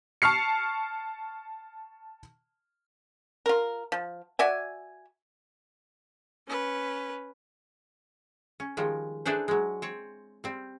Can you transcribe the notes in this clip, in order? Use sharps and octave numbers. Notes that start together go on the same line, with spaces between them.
A5 C#6 F6 C7 C#7
F4 A#4
F3
F#4 D5 E5 G#5
C#4 B4
C#4
D#3 F3 G3 G#3
D4 E4 G#4 A4 B4 C5
F#3 G#3
C4 C#5
G3 C4